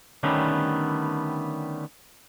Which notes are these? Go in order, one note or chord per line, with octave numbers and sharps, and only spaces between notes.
D3 D#3 G3 A3 B3 C#4